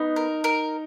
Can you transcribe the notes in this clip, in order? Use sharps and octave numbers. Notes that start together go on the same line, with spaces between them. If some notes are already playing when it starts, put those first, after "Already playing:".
Already playing: B3 D#4
A#4
A#4